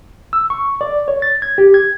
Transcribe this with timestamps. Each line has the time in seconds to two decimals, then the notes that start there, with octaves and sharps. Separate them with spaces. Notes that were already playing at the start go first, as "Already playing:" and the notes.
0.33 E6
0.50 C#6
0.81 D5
1.08 C#5
1.22 A6
1.42 G#6
1.58 G4
1.74 G#6